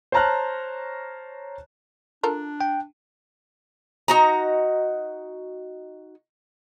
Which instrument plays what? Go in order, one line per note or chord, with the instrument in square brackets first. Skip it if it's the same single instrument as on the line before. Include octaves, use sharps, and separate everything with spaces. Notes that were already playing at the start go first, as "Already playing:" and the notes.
[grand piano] C5 C#5 A5 A#5 F6 F#6
[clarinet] D4 [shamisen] F4 A4 A#4
[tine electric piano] G5
[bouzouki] D#4 F#4 A#5